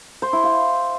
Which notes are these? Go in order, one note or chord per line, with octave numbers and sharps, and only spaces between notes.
C5
E4
F5